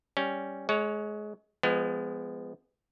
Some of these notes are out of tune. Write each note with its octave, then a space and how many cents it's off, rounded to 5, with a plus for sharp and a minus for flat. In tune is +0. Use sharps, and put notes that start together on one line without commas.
G3 +0 C#4 +0
G#3 +25 C#5 +0
F3 +0 G#3 +0 B3 +25